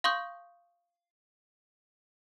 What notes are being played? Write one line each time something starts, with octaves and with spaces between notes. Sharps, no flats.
F5 C6 C#6 D#6 G6